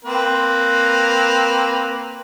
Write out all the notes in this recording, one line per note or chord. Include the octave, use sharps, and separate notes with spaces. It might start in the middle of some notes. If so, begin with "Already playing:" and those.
A#3 C4 B4